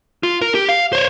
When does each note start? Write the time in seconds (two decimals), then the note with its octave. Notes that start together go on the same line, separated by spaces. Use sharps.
0.23 F4
0.42 A#4
0.55 G4
0.69 F5
0.93 C5 C#5